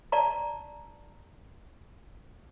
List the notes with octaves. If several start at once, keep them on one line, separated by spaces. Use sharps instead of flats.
D5 A5 A#5